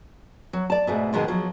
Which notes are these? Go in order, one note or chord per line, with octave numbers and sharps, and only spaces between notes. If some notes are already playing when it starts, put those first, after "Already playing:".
F#3
D5 A5
G#2 B2 A3
G#2 B2 D#3 G#3
F3 F#3